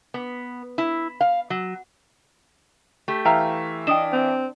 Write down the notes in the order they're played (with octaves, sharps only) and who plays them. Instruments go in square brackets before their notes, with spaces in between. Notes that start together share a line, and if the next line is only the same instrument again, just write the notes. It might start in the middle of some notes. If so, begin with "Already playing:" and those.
[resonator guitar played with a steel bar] B3
E4
F5
F#3
A3 G4
[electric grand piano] E3 E5 F5 [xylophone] G5 A#5 F6
[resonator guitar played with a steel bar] D4 [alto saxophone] D#5 [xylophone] G5 D#6 E7
[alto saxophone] C4